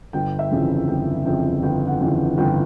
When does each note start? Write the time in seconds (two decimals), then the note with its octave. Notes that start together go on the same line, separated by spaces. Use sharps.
0.13 G1 G5
0.39 E5
0.51 F2 C#3 E3
0.88 G1 G5
1.25 F2 C#3 E3 G5
1.63 G1 G5
1.87 F#5
2.00 F2 C#3 E3
2.38 G1 G5